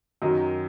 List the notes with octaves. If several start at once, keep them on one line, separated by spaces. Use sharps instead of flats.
F#2 D#3 F#3 D#5